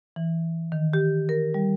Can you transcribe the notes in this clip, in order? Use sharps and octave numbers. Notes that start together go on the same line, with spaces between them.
E3
D#3
G4
A#4
G3